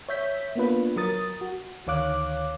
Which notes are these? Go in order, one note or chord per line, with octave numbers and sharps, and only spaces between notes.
C#5 E5 G6 B6
A#3 B3 D4 F4 B4
F#3 A#4 D#6 A6
F#4
D2 D#3 C#5 F5 D6 F#6